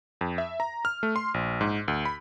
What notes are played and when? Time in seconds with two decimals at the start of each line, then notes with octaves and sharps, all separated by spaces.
0.21 F2
0.38 E5
0.60 A#5
0.85 F6
1.03 A3
1.16 C6
1.34 A#1
1.61 G#2
1.88 D2
2.05 B5